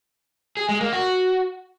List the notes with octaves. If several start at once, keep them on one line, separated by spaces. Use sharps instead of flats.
G#4
G#3
A#3
F#4